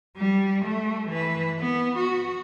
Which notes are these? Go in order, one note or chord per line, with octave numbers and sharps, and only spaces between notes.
G3
A3
E3 B4
B3
F#4